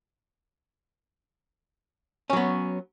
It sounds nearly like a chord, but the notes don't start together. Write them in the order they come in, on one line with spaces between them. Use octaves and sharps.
C#4 F#3 B3